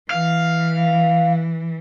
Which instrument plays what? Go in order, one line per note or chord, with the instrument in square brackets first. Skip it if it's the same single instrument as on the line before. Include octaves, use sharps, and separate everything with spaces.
[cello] E3 [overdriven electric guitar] F5